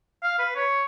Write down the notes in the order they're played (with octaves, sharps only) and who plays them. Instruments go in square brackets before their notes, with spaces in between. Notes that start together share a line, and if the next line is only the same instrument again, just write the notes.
[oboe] F5
B4
C#5